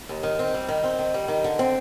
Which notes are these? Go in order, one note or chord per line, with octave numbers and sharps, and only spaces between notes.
D#2
D#3
C4
G3
D#3
C4
D#3
G3
D#3
D3
C4